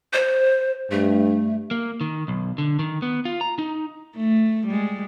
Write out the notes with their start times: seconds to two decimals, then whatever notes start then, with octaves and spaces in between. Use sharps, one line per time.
0.13 C5
0.91 G2 A3
1.71 A#3
2.01 D#3
2.28 B1
2.58 D3
2.79 D#3
3.02 B3
3.25 F4
3.41 A#5
3.59 D#4
4.16 A3
4.67 G3 G#3